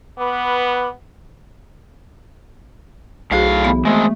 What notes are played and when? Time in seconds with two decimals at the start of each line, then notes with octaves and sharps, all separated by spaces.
0.19 B3 B4 B5 D6
3.31 B1 A2 F#4 G#4 C5 F5
3.64 E3 B3 B5
3.85 G#3 A3 C4